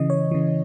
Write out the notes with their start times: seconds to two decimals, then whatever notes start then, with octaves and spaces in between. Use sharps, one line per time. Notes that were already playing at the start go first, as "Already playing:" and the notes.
Already playing: C#3 E3 D#5
0.10 C#5
0.31 C#3 E3